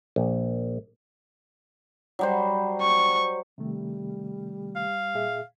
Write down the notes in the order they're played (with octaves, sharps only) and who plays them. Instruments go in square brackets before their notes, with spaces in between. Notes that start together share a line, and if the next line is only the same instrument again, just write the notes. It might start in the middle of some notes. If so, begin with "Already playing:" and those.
[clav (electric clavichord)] A#1
[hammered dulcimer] F#3 G3 C5
[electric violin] C#6
[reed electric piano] C3 D#3 A3 [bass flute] G3
[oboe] F5
[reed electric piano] A#2 G#4 E5